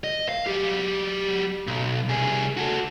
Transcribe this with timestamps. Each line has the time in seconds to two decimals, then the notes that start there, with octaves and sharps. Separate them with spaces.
0.04 D#5
0.29 F5
0.47 F#3 G4
1.67 B1
2.09 C2 G#4
2.57 F#4 A4